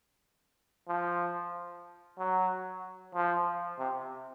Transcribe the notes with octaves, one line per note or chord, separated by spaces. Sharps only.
F3
F#3
F3
C3